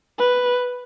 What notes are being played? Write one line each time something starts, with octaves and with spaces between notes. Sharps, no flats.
B4